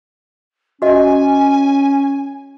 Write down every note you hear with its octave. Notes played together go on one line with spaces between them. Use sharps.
C#4 F#4 D#5 G#5